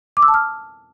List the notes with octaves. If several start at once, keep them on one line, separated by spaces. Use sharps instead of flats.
D6
E6
A5
F6